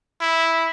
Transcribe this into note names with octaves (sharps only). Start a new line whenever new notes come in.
E4